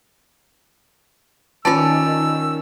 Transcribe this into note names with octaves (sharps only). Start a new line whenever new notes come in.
D#3 C#4 F4 D5 A5 E6